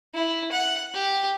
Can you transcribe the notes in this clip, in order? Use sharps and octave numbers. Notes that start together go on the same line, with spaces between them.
E4
F#5
G4